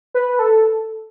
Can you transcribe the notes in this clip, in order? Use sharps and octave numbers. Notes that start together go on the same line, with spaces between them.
B4
A4